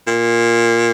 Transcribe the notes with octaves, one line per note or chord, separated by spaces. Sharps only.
A#2